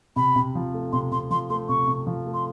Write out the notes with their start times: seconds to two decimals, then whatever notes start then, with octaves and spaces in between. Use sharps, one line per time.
0.16 C3 B5
0.36 C3
0.55 F3
0.73 A3
0.92 C3 C6
1.12 C3 C6
1.31 F3 C6
1.50 A3 C6
1.69 C3 C#6
1.87 C3
2.07 F3
2.26 A3
2.34 C6